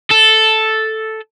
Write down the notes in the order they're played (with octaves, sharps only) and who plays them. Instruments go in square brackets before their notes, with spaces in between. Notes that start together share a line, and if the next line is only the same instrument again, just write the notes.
[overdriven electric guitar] A4